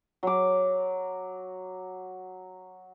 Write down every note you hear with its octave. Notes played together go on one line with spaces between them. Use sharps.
F#3 D6